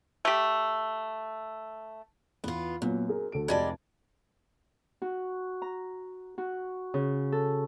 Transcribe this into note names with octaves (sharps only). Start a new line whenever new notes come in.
A3 G4
E2 B3 F4
F#2 A#2 F#3 B3
G#4 A#4
D2 A4 D7
F1 G3 G#3 D5 A5 G#6
F#4
A#5
F#4
C#3
A4